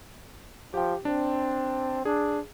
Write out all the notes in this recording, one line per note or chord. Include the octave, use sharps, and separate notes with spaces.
F3 G4 G5
C4 D4
D4 G#4